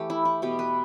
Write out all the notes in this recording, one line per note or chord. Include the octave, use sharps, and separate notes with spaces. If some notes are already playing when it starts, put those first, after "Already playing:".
Already playing: E3 A3 G4
E4
E4
B2 B3 G4
B4